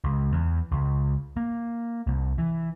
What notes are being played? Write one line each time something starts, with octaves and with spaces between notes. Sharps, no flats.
C#2
E2
C#2
A#3
C2
E3